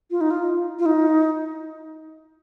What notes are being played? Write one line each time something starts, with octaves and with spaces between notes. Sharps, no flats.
F4
D#4
F4
F4
D#4